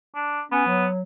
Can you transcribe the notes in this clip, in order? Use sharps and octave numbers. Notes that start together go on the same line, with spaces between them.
D4
B3 C#4
F#3